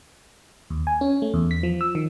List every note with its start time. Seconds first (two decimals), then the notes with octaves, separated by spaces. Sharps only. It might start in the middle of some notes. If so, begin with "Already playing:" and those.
0.70 D#2
0.87 G#5
1.01 C#4
1.22 A3
1.34 E2
1.51 B6
1.63 F3
1.81 E6
1.95 D#3